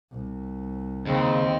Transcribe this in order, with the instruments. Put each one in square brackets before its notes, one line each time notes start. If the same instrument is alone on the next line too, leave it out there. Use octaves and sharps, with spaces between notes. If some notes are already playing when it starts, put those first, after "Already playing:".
[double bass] C2
[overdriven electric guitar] D#2 [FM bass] C#3 [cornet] C4